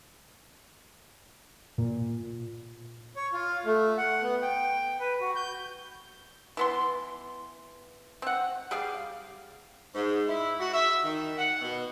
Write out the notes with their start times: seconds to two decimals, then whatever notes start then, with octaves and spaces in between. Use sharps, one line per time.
1.78 A#2
3.16 C#5
3.33 F4
3.65 A3
3.98 F#5
4.23 B3
4.42 G5
5.00 B4
5.21 F#4
5.36 G6
6.57 E3 B3 C6
8.22 C4 F#5
8.71 G3 G#4 D5 F5
9.93 G#2
10.28 E4
10.59 F#4
10.73 E5
11.03 D#3
11.37 F#5
11.61 B2